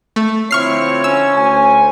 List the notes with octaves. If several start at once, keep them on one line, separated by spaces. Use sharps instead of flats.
A3
D3 F3 C4 E4 C#5 C#6 F6 C7
C#4 E6
D2 C5 G#5